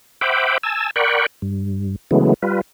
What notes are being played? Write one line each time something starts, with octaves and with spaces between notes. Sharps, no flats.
C5 E5 F#5 G5 B5 D6
G#5 A5 E6
A#4 D5 F#5 G5 B5 C#6
G2
C#3 E3 F#3 G#3 A3 B3
G3 F4 B4